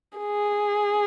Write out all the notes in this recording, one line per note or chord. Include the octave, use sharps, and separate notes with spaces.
G#4